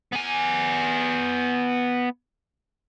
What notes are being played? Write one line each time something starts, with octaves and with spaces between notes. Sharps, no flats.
B3 G#5